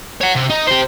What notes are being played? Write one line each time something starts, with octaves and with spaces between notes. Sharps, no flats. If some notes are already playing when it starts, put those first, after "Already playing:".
C#5 F#5
C3
D#4
G4 C5